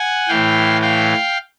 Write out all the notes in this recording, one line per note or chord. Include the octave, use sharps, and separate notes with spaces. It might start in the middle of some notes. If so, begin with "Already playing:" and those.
Already playing: F#5 G#5
A2 E3 F5 G5
F5 G5